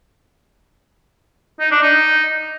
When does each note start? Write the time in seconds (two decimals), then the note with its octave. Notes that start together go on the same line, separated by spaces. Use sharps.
1.60 D#4
1.71 D4
1.82 D#4